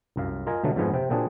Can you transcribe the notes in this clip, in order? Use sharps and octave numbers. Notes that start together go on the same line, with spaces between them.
C2 F#2 F5
F4 A#4 D#5 G#5
B2 D3 F#3 A3 D#4
F2 G#2 F3 B3 F4 G#5
C3 C4 G5
A#2 F#3 A#3 C4 D4 G#4